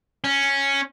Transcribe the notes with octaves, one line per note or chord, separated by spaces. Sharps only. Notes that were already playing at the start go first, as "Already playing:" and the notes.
C#4